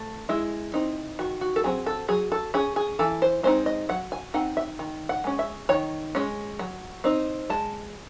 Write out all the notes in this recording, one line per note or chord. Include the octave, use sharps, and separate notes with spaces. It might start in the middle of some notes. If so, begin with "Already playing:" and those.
Already playing: A3
G#3 E4
C4 D#4
D#3 F#4
F#4
A4
F#3 C4 G#4
A4
F#3 G#4
A4
C#4 G#4
G#4
E3 A4
C5
G#3 C4 D#4 C5
D#5
F#3 F#5
G#5
C4 D#4 F#5
E5
D#3
F#5
G#3 C#4
E5
D#3 C#5
G#3 C#4
F#3
C4 D#4
G#3 A5